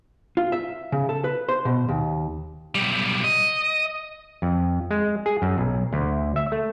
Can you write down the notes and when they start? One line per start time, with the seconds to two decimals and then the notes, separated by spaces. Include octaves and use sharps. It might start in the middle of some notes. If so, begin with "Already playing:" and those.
0.37 F4
0.52 E5
0.92 C#3
1.09 A4
1.24 B4
1.49 C5
1.65 B2
1.89 D#2
2.75 B1 G3
3.24 D#5
4.42 F2
4.91 G#3
5.26 G#4
5.42 F#2
5.58 B1
5.93 D2
6.36 E5
6.52 A3